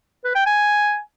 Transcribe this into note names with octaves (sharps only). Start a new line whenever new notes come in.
B4
G5
G#5